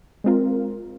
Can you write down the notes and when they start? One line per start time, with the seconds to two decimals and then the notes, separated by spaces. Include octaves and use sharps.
0.24 G#3 C4 F4 A#4